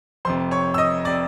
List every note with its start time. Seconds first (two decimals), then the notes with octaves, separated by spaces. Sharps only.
0.25 F1 F2 C3 C5 C6
0.51 C#5 C#6
0.74 E6
0.78 D#5 D#6
1.05 C3 D5 D6